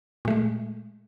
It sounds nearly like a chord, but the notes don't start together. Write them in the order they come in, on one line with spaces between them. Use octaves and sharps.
A#2 A3 G#3